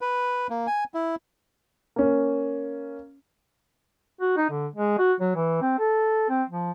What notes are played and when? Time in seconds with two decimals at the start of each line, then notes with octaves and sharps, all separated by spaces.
0.01 B4
0.50 A#3
0.67 G#5
0.94 E4
1.96 A#3 C#4
4.21 F#4
4.37 D#4
4.50 D3
4.75 G#3
4.98 F#4
5.20 F#3
5.35 E3
5.62 C4
5.79 A4
6.29 C4
6.50 F3